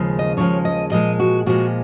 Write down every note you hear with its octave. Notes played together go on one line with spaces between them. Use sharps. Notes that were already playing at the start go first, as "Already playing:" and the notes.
Already playing: D#2 C#3 F3 G#3
D#5
D#2 C#3 F3 G#3 C#5
D#5
A#2 F3 G#3 D#5
F#4
A#2 F3 G#3 F#4